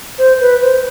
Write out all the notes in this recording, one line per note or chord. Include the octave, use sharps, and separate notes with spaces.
C5
B4
C5